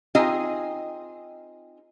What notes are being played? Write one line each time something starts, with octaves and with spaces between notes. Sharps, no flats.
C4 D#4 F4 G#4 D#5 G#5